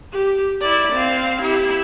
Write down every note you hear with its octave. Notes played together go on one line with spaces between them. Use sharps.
G4
E4 D5
C4 F5
E4 G4